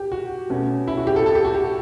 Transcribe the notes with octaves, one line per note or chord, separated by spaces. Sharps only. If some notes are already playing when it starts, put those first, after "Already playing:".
Already playing: G4
F#4
B2 A3 C#4
E4
F#4
G4
A4
A4
G4
F#4
G4